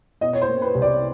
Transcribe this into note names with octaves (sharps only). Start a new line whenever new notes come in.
B2 D#5
C#5
C5
A#3
B4
C2
D5